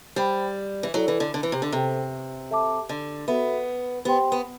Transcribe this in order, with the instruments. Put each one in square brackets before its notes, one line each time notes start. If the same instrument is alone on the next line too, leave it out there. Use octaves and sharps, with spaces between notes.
[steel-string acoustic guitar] G3 [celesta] C5 G5 B5
[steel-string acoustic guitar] E3
[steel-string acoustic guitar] F#3 [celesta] E4 A4 D5
[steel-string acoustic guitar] E3
D3
D3
E3
C3
D3
[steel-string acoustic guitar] C3 [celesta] A4 C5 G5
[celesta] A4 E5 A5 D6
[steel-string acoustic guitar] D3
[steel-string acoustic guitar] B3 [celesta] F#4 A4 E5 B5
[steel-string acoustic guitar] B3 [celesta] G4 C5 G5 C6
[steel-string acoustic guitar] B3